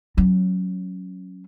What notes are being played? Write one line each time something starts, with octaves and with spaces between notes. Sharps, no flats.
F#3 C#4